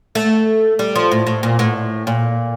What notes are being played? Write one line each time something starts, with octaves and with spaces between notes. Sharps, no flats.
A3
G3
F3
A2
A2
A#2
A2
A#2